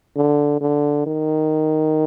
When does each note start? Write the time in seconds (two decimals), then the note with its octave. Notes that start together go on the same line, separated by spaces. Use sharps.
0.16 D3
0.61 D3
1.06 D#3